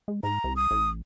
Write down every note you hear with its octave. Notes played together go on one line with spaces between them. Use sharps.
G#3
G#2 A#5
C2
D#6
A1